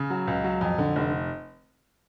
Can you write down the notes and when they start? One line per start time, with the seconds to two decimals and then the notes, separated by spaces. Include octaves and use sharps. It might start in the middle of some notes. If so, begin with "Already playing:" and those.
Already playing: C#3
0.10 F#3
0.27 C#2
0.44 F#3
0.61 F2
0.78 D3
0.96 F1